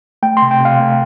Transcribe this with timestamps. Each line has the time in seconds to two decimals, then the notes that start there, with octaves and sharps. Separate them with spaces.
0.23 A3 G5
0.37 C6
0.42 C3
0.51 G5
0.60 C3 F5
0.80 A3